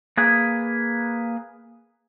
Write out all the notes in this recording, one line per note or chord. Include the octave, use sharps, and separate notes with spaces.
A#3 G#4 B4